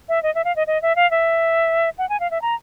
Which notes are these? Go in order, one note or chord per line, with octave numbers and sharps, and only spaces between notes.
E5
D#5
E5
F5
D#5
D#5
E5
F5
E5
F#5
G#5
F5
E5
A#5